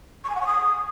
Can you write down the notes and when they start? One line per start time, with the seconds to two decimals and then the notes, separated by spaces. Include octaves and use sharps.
0.24 C#6
0.30 G#5
0.35 F#5
0.41 C#6
0.46 D#6